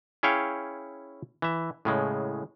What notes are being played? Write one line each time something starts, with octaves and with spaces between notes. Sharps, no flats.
C#4 E4 G#4 C#5 F5 G5
E3 E5
A2 C#3 G#3